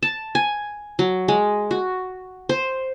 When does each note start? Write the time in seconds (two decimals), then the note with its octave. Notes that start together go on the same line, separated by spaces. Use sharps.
0.03 A5
0.35 G#5
0.99 F#3
1.28 G#3
1.71 F#4
2.49 C5